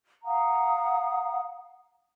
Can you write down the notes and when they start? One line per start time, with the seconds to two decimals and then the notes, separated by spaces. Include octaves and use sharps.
0.24 F5 F#5 A#5 D#6